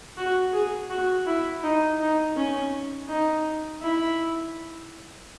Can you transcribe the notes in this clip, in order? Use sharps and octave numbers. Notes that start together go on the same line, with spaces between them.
F#4
G#4
F#4
E4
D#4
D#4
C#4
D#4
E4